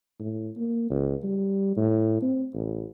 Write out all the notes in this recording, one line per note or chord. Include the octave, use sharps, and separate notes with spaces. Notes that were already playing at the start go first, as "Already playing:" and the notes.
A2
A#3
C#2
G3
A2
C4
A1